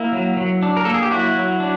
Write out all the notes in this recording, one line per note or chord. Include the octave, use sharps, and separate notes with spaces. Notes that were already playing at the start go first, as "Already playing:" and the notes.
Already playing: A#3 E4
F#3
F#3
D4
A#4
A#3 A4
G#4
G4
F#3 E4 F#4
F#3
D4